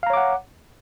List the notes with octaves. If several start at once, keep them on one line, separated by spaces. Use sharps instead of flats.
C#5 F5 F#5 A#5 D6